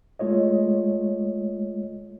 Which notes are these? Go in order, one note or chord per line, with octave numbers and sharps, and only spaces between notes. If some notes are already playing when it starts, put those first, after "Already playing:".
G#3 A3 F4 C#5 D#5